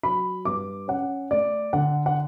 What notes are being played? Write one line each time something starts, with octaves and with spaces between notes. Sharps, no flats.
F#3 B5
G2 D6
C#4 F#5
A3 D5
D3 F#5
F#5